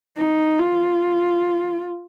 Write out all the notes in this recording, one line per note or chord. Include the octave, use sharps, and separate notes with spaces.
D#4
F4